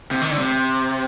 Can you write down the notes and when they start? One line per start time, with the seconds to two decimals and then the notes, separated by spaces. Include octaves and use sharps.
0.11 C3
0.22 D#3
0.30 D3
0.39 C3